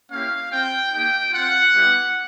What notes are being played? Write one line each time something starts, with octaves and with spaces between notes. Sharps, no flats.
A#3 C#4 E4 G4 F5
C4 F4 G5
A#3 D#4 G4 G5
C4 F4 F#5
G3 B3 E4 G4